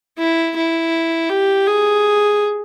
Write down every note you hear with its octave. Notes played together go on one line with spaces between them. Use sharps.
E4
E4
G4
G#4